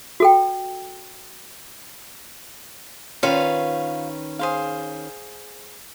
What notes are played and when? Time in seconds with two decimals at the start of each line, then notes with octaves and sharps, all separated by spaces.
0.20 F#4 A4 G5
3.23 D#3 C#4 F4 B4 C5 F5
4.39 G#4 C5 F5